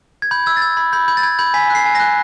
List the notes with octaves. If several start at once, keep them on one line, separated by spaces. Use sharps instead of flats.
G#6
B5 G6
E6 G#6
A6
E6 G#6
B5 G#6
B5 G6
B5 G6
A6
B5 G#6
B5 G6
G#5 B6
F#6 C7
G#5
F#6 A#6